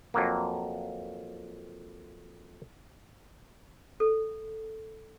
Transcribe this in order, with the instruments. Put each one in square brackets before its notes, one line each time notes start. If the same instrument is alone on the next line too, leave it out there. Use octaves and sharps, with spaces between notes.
[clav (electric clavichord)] F2 F#3 A#3
[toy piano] A4